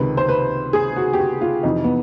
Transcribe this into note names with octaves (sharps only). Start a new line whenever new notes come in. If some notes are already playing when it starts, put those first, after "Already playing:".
Already playing: C#2 C3 D#3 B4
C5
B4
G#4
F#4
G4
F#4
F4
F2 C3 E3 D#4
B3